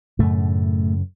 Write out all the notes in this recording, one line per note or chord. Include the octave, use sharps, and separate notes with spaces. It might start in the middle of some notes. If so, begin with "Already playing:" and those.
F#2 A2 C#3 A3